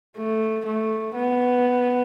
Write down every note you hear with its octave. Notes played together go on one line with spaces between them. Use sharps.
A3
A3
B3